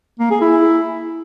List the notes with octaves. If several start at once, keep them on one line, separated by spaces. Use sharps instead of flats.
A#3
G#4
E4